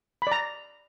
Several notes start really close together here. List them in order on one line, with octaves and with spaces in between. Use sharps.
B5 D5 A#5